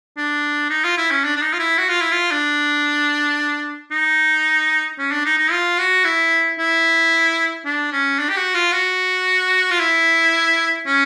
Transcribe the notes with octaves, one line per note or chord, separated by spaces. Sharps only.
D4
D#4
F4
E4
C#4
D4
D4
D#4
F4
E4
F#4
F4
E4
F4
D4
D#4
C#4
D4
D#4
D#4
F4
F#4
E4
E4
D4
C#4
D4
G4
F#4
F4
F#4
F4
E4
C#4